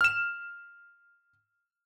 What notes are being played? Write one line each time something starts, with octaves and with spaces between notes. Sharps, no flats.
F6 E7